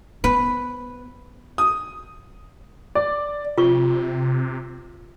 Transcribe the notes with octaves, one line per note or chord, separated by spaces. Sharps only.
B3 B4
D#6
D5
C3 F4 C#6